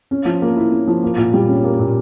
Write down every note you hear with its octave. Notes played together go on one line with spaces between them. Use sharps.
C#4
F3
A#3
E4
C#4
F3
A#3
A#2
G3
C#4
A#3
A#2